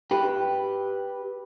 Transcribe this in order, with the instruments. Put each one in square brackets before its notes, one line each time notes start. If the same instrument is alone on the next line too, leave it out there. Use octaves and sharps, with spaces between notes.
[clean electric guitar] G4 B4